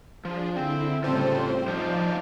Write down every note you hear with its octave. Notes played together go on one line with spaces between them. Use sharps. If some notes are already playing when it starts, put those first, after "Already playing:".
F3 D4 G#4
D3 C4 E4
A2 C#3 G3 C4 F4 A4 C5
F3 D4 D#4 C5 D5 F5